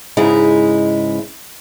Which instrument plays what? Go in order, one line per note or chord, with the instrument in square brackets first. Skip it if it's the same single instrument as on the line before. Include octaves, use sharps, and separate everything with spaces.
[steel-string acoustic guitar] G#2 C#3 G#3 D#4 E4